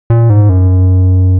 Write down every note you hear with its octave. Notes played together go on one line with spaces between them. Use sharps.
A#2
G#2
F#2